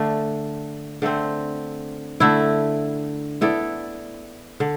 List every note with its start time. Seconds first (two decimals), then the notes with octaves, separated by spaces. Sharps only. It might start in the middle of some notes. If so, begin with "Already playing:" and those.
Already playing: D3 A3 D4
1.02 D3 A3 C4
2.20 D3 A3 E4
3.41 B3 E4 A4 D5
4.60 D3